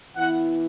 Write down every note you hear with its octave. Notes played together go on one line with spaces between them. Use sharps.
E3 B3 E4 F#5